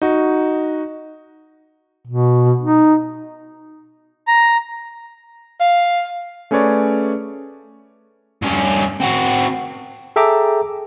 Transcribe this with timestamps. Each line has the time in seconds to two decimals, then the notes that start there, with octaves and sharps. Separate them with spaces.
0.02 D#4 F#4
2.07 B2
2.61 D#4
4.27 A#5
5.60 F5
6.51 A3 C#4 G#4 B4 C#5 D5
8.42 G2 C#4
9.01 C4 F#4
10.16 G#4 A4 E5 G5 A#5 D6